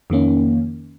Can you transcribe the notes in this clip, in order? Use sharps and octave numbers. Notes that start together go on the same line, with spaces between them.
F2 D#3 A#3 C#4